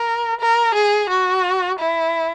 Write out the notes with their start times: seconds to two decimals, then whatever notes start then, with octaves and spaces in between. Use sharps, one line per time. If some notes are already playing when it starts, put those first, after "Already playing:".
Already playing: A#4
0.40 A#4
0.74 G#4
1.09 F#4
1.79 E4